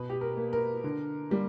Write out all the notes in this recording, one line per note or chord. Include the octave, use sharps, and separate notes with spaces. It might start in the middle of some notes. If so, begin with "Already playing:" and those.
Already playing: B2 B4
G4
A#4
A#3
A#4
D3
G3 A#3